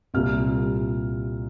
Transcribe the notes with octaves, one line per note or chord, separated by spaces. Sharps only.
C2 A#2 G3 F6